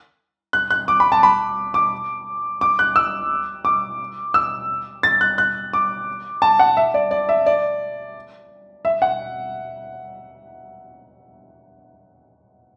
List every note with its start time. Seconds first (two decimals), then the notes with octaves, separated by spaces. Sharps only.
0.53 F#6
0.70 F#6
0.88 D6
1.00 B5
1.12 A5
1.23 B5
1.74 D6
2.61 D6
2.79 F#6
2.96 E6
3.65 D6
4.34 E6
5.03 A6
5.21 F#6
5.38 F#6
5.73 D6
6.42 A5
6.59 F#5
6.77 E5
6.94 D5
7.11 D5
7.29 E5
7.46 D5
8.85 E5
9.02 F#5